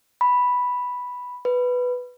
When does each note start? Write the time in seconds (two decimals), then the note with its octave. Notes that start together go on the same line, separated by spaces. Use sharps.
0.21 B5
1.45 B4